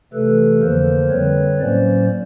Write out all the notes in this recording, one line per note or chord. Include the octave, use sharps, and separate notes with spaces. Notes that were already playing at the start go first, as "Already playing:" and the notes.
C3 E3 A3 A4 B4
F2 D3 F3 A#3 A#4 C5
D3 G3 C4 B4 C#5
A2 F#3 A#3 C#4 C5 D5